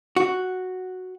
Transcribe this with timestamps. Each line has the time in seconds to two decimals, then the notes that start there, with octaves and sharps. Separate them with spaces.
0.16 F#4